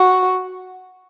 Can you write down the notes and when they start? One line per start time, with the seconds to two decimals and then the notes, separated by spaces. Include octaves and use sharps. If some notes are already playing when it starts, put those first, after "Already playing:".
Already playing: F#4